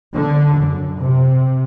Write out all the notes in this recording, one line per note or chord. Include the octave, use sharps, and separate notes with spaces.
D3
F#2
C3